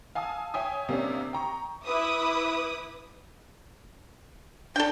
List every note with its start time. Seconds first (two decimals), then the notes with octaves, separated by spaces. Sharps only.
0.15 F5 G#5 A5 D#6 E6
0.54 C#5 E5 G5 G#5 D#6
0.89 C3 A#3 C#4 D4
1.33 G5 A#5 C#6
1.85 E4 B4 E5 D6 D#6
4.76 D4 A4 G5